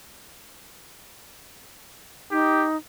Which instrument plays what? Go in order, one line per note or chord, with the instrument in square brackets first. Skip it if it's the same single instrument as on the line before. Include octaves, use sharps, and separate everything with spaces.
[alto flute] D#4 [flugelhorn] G4